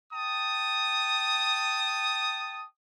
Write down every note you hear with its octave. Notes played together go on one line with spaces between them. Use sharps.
G5 A5 D#6